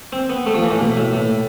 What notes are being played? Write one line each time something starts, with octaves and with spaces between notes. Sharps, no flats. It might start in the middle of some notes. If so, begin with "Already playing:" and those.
C4
B3
A3
F3
E3
A2
B2
A2
A2